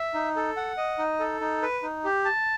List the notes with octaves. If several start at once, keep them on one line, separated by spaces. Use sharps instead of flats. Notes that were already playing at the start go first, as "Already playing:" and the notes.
Already playing: E5
D#4
A4
F#5
D#5
D#4
A4
D#4
B4
D#4
G4
A5